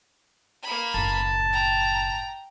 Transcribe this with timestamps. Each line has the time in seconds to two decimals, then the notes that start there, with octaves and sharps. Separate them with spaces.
0.63 A#3 B5
0.94 F#1 A2 A5
1.53 G5 A#5